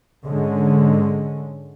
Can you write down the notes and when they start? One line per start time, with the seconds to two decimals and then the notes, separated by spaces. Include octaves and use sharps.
0.24 G#2 D3 G#3 C#4